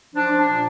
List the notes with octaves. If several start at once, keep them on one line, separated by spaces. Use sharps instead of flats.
F3 D4
F3
D4
A#2